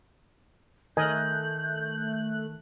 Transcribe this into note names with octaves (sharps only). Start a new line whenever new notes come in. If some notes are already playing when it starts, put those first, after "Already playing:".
D#3 A3 A#4 D#5 G#5 F#6 G6